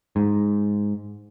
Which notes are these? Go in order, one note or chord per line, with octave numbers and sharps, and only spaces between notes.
G#2